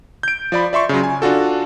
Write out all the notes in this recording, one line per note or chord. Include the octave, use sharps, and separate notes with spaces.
G6 D7
F3 D5 B5
D5 E5 C6 C#6
C#3 F#3
G#5
D4 F4 F#4 A4